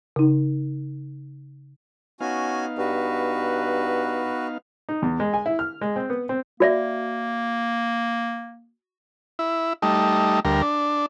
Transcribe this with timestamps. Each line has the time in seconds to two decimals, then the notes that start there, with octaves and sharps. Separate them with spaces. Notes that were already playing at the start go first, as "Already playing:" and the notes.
0.16 C#3 D#4
2.20 B3 C#4 D#4 F#4 F5 G#5
2.78 G2 F#4 B4
4.89 D#4
5.02 E2
5.20 G#3
5.33 G#5
5.46 E4
5.59 F6
5.81 G#3
5.96 C4
6.10 B3
6.29 C4
6.60 A#3 F#4 D5 E5
9.39 E4
9.82 G3 A3 D#4
10.45 D2 G3 A#4
10.62 D4